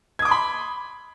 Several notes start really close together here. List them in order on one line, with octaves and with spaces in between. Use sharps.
G#6 D#6 D6 C6 B5